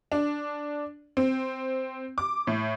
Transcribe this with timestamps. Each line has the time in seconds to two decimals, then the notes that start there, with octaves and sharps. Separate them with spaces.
0.12 D4
1.17 C4
2.18 D6
2.47 A2